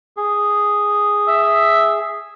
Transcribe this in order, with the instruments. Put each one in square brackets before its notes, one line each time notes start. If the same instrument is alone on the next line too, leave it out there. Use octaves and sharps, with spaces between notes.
[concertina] G#4
[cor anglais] E5